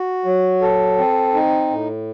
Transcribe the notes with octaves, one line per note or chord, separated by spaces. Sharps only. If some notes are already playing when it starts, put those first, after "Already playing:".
Already playing: F#4
F#3
A4
C4
D#4
A2